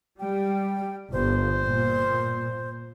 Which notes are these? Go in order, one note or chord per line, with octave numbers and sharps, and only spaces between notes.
G3 G5
G1 C5
A#2